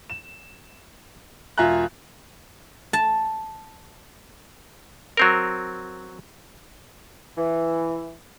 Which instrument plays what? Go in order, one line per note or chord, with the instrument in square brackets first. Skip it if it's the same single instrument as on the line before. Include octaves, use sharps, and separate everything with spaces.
[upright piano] E7
E1 F4 E5 G#5 A#5 F#6
[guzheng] A5
[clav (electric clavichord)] F#3 C4 A#4
[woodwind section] E3